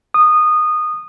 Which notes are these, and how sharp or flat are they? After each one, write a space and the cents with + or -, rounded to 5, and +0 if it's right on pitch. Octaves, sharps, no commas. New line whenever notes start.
D#6 -20